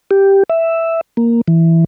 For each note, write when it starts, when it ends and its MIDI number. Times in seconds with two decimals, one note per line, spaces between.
0.11 0.43 67
0.50 1.01 76
1.17 1.41 58
1.48 1.84 52